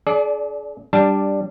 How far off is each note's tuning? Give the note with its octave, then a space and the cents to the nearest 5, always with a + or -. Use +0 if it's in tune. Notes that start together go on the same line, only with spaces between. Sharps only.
D4 -25 G#4 +35 D5 +0
G3 +5 D4 +0 A5 +0